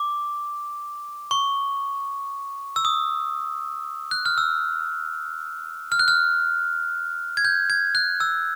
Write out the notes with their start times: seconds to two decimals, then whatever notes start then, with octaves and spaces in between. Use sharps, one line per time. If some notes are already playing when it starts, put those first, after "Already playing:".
Already playing: D6
1.31 C#6
2.76 E6
2.85 D#6
4.11 F#6
4.26 F6
4.38 E6
5.92 F6
5.99 F#6
6.08 F6
7.37 G#6
7.45 G6
7.70 G#6
7.95 F#6
8.20 E6